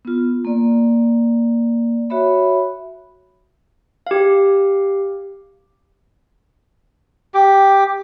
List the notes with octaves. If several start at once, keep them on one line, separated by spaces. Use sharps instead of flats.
B3 F4
A#3 D5
F#4 C#5 E5 B5
G4 F5
G4